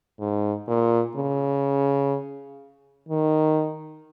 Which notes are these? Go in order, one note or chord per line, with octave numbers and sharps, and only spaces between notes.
G#2
A#2
C#3
D#3